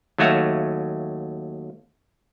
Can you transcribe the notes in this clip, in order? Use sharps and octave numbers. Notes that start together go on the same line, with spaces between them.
D#2 F#3 A3 F#4 E5 F5